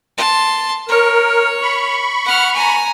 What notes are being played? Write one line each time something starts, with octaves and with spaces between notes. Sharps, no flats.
A5 C6
A#4 C#5
B5 C#6
F#5 F6
G#5 A#5